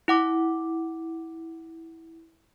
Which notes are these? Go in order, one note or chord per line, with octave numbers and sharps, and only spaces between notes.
E4 F#5 D6